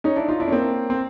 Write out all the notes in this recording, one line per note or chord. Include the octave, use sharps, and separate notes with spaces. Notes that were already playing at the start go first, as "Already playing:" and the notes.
C#4 D#4
D4 E4
D#4 F4
D4 E4
C#4
A#3 C4
C4